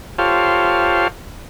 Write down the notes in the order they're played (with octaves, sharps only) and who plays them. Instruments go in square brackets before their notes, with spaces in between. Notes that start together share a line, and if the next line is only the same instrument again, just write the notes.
[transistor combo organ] F4 G4 A4 C5 C#5 F5